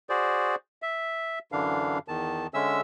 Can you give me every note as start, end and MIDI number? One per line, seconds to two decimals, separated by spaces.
0.09 0.56 66
0.09 0.56 68
0.09 0.56 72
0.09 0.56 74
0.82 1.39 76
1.52 1.99 42
1.52 1.99 50
1.52 1.99 52
1.52 1.99 62
1.52 1.99 77
2.08 2.47 40
2.08 2.47 51
2.08 2.47 81
2.54 2.81 50
2.54 2.81 56
2.54 2.81 61
2.54 2.81 76
2.54 2.81 88